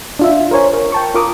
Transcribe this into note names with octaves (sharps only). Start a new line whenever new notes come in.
D4 F4 E5
A#4 C5 C#5 G#5
A#4
G5 A5 C#6
F4 A#4 D6 D#6